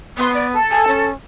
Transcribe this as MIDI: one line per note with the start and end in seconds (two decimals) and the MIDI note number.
0.18 0.54 59
0.18 0.30 84
0.34 0.47 74
0.53 1.09 69
0.71 0.86 80
0.88 1.12 61